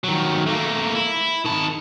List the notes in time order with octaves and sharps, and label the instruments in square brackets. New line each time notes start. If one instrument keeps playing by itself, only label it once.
[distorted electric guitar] D#3 F#3
A3 A#3
E4
D#3 A5